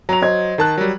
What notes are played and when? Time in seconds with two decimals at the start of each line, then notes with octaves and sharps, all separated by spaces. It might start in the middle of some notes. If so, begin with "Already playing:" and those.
0.09 F#3 A#5 F7
0.22 C5 D#5 G#6
0.58 D#3 A#4 A5 F#6
0.78 F#3 G3